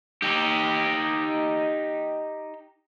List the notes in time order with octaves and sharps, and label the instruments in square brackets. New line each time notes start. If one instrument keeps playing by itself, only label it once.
[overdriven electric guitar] D#4 G4